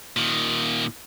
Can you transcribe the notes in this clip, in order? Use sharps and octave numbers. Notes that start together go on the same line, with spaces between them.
A#2 D#3